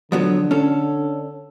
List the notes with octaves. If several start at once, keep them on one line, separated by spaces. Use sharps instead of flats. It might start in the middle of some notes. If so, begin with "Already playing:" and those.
D3 F3 F#3 B3
C#4 A4